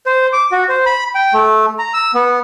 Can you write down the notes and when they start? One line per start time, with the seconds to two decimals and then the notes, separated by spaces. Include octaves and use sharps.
0.06 C5
0.33 D6
0.52 F#4
0.69 C5
0.86 B5
1.15 G5
1.33 A3
1.79 A#5
1.94 E6
2.14 B3